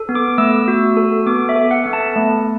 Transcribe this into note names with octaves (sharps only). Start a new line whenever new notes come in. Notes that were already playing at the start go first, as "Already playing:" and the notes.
Already playing: A4
B3
D6
A3 E6
F#4
A4
B3 D6
E5
A4
F#5
B3
A5
A3